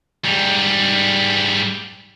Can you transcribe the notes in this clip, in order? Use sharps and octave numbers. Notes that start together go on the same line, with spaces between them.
G#2 G3